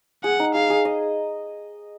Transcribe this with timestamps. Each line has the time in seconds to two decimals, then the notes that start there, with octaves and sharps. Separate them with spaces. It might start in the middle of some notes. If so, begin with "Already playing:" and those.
0.24 G#4 F#5
0.40 D#4
0.55 G#4 F5
0.70 G#4
0.85 D#5